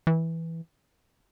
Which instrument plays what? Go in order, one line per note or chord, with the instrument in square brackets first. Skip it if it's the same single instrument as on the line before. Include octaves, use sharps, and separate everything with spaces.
[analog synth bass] E3